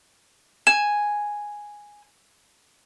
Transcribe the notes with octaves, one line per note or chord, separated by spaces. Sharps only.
G#5 E7